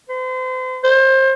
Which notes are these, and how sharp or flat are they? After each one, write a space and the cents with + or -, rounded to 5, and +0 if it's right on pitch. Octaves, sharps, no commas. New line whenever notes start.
C5 -35
C5 +25